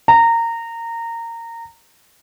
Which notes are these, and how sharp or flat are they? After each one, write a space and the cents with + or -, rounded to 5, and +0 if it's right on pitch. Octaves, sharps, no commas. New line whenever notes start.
A#5 -20